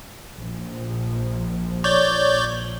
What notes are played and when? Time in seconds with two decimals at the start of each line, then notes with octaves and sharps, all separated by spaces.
0.36 A#1 F3
1.84 C#5 D5 G6